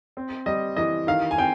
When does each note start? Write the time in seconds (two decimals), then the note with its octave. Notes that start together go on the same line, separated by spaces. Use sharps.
0.17 C4
0.46 G3 D#5
0.77 E3 D#5
1.07 D#3 F5
1.31 G#5
1.38 C4 G5